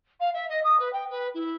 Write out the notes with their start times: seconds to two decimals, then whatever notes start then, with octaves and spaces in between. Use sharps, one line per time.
0.20 F5
0.33 E5
0.49 D#5
0.63 D#6
0.79 B4
0.92 G5
1.10 B4
1.34 E4